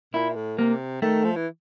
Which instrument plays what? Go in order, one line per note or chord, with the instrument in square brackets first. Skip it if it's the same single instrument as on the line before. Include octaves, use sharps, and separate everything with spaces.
[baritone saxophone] A#2 [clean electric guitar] E4
[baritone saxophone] A2
[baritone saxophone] C3 [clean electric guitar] A#3
[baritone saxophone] D#3 [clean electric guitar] A3
[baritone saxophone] F3
E3